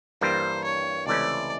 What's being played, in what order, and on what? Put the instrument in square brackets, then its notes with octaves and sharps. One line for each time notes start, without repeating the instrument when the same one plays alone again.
[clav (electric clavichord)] G2 E3 G3 A#3 [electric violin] C5
[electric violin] C#5
[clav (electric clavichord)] C#2 C3 E3 A3 C#4 [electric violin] D5